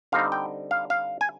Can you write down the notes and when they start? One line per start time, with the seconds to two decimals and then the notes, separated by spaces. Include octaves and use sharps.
0.12 D3 G3 C4 D#4 F5
0.32 G5
0.71 F5
0.90 F5
1.21 G#5